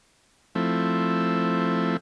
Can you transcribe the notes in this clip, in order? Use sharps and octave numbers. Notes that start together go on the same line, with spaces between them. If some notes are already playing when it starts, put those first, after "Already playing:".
F3 A3 C4 E4